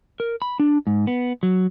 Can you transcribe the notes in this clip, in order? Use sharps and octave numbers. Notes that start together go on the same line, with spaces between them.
A#4
B5
D4
G#2
B3
F#3